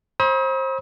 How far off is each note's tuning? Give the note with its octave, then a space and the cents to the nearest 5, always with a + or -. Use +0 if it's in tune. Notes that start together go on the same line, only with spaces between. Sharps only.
C5 +30 B5 -40 D#6 +45